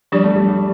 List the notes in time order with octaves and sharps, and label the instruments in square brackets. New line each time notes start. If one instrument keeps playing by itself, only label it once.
[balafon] F3 D4 G4 D5 [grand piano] G3
[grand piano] A3
G3
G3